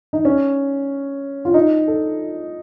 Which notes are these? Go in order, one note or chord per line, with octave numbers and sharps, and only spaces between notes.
D#4
C#4
F4
D#4
A4